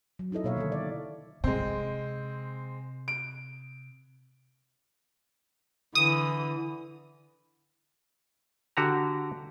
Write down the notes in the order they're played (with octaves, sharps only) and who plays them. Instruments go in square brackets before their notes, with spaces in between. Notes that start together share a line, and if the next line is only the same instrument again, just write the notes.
[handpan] F#3
C4 D#4 E4 A4 D#5
B2 A#3 C#5 E5 F5
D3 D#3 A#3 A4
D5
[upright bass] C3 [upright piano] G#3 C4
[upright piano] D7
[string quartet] D3 E3 [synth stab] D#6
[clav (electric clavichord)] D3 F#4 G4 A#5